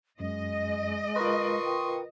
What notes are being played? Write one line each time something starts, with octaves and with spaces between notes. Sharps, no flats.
F#2 G#3 D#5
F4 A#4 B4 C6 C#6 D#6
G5